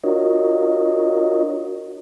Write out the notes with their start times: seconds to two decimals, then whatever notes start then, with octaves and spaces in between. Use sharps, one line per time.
0.04 D4 F4 F#4 A#4 C#5 D#5